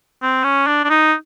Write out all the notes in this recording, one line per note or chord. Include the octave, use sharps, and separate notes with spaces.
C4
C#4
D4
D4
D#4